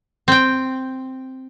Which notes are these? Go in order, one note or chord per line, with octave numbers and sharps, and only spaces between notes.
C4 G5